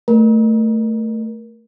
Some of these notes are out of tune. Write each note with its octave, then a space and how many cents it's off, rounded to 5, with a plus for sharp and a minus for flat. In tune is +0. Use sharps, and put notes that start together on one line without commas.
A3 +15 A#4 +30